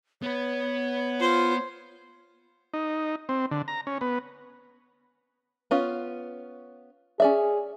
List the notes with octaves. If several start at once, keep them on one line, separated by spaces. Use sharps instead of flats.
B3 B4 C#5
F4 C5
D#4
C4
D3
A#5
C#4
B3
B3 C#4 F4
C#4 G#4 D5 E5